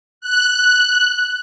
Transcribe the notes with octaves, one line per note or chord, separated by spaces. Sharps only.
F#6